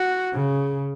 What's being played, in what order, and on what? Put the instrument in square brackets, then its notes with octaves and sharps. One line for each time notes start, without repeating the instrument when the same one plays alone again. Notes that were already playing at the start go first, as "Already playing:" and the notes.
Already playing: [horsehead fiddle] F#4
[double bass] C#3